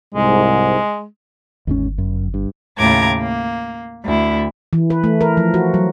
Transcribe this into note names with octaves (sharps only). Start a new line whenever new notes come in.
C2 G#2 G#3
G1 D#2 G#2 C#4
F#2
G2
D#2 A2 C#3 A#5 D6 G#6
A#3
D2 E4
E3
B4
A3
A#4
F3
F#4
F#3